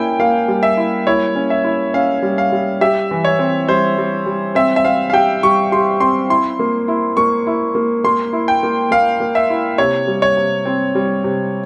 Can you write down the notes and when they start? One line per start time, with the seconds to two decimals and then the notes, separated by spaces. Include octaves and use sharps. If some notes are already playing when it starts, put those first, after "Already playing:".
Already playing: A#3 C#4 E4 G5 G#5
0.19 A#3 F5
0.48 G3
0.63 E5
0.77 E4
1.07 E4 C#5
1.35 C#4
1.50 E5
1.64 E4
1.94 C#4 F5
2.22 G3
2.38 F5
2.52 G3
2.81 G4 E5
3.11 E3
3.25 C#5
3.39 C4
3.68 G3 C5
3.98 G3
4.26 G3
4.55 C4 E5
4.76 E5
4.84 C4 F5
5.10 F5
5.13 G4 G5
5.43 G3 C#6
5.72 G4 C6
6.00 C4 C6
6.30 E4 C6
6.59 A#3
6.88 E4
7.17 A#3 C#6
7.47 E4
7.75 A#3
8.04 A#3 C6
8.33 E4
8.48 G5
8.63 A#3
8.91 A#3 F5
9.20 A#3
9.35 E5
9.50 E4
9.78 C3 C#5
10.07 G3
10.22 C#5
10.37 C3
10.65 C4
10.95 G3
11.24 C3